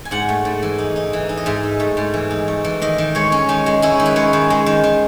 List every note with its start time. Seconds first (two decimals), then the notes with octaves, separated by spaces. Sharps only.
0.05 G#5
0.11 G#2 F#5
0.29 A3
0.45 G#2
0.63 E3
0.78 D#4
0.96 D#4
1.13 E3
1.29 D#4
1.37 D#5
1.46 G#2 E5
1.63 D#4
1.80 A3
1.97 G#2
2.14 E3
2.31 D#4
2.48 A3
2.65 E3
2.82 D#3 D#5
2.98 D#3
3.15 G#3 C#5
3.32 C#4
3.49 D#3 D#4
3.66 G#3
3.82 C#4 E4
4.00 D#3
4.06 B4
4.16 G#3 C#5
4.33 D#3
4.50 G#3
4.66 D#3
4.83 D#3